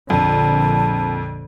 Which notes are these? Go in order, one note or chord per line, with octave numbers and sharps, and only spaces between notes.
A#1 F2 D3 A5